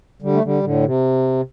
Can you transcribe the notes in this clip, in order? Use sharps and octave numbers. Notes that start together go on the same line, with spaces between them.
D3 G3
A3
D3 G3
A2 D3
C3